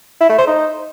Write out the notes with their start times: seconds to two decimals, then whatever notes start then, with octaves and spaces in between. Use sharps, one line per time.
0.21 E4
0.30 A3
0.39 C5
0.47 D#4